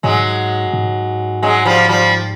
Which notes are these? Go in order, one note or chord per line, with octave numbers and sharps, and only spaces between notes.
G#2 F#3 G#3
G#2
F#3 G#3
F3 G3
F3 G3